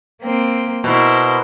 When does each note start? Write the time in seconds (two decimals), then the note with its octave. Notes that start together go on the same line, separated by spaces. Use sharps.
0.23 A#3 C4
0.84 B2 E4 A#4 C5